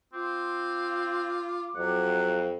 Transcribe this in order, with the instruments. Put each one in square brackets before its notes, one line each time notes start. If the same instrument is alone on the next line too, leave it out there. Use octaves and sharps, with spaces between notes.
[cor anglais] C4 [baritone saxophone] F4 [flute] D6
[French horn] F2 [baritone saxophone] F#3 [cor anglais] F#5
[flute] F5